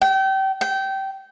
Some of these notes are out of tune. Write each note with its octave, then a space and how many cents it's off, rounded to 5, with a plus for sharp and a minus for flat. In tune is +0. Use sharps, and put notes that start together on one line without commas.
G5 -30
G5 -20